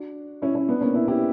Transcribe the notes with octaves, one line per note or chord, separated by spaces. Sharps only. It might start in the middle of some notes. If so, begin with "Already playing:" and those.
Already playing: D4 F#4
C#4 E4
C#4 E4
B3 D4
A#3 C#4
C#4 E4
E4 G4